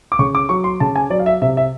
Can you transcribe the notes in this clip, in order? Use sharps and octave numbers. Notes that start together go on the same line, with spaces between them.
D6
C#3 C#6
D6
F#3 C#6
C6
C#3 A5
G#5
F#3 D5
F5
E5
C3 E5
E5